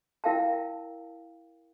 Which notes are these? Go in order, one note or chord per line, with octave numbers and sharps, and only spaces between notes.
E4 A#4 F5 G5 A5